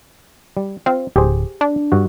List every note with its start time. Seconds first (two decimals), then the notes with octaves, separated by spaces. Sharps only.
0.57 G3
0.86 C4 F4 F5
1.16 D1 G4 G#4 C5
1.61 D4
1.92 G2 F#4